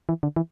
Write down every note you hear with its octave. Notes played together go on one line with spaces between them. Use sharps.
E3
D3
E3